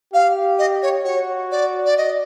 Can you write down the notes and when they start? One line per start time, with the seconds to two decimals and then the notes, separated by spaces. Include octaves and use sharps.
0.13 G4 F5
0.59 D#5
0.82 C#5
1.05 F#4 C#5
1.51 D5
1.85 D5
1.98 D#5